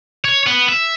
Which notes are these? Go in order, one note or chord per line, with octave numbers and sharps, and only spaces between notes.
C#5
B3
E5